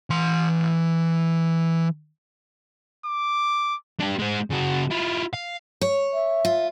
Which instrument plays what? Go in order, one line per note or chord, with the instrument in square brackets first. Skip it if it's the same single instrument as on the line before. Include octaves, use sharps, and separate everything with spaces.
[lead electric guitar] E3 C6
[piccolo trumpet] D6
[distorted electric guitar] D4 G4
G#3 C5
C#3 F#4
E4 F4
F5
[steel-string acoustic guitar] C#5
[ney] E5
[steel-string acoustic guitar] F4